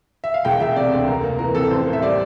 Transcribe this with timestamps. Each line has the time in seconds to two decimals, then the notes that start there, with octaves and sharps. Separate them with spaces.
0.24 E5
0.34 F5
0.45 E1 G5
0.60 E1 E5
0.76 C3 D5
0.92 D2
1.08 F1 A#4
1.24 A#3
1.39 E3 A#4
1.55 F2 A4
1.71 A1 C5
1.87 A#3
1.93 E5
2.02 G3 D5